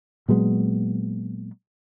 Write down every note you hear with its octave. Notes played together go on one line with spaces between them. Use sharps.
A#2 F#3 G#3 B3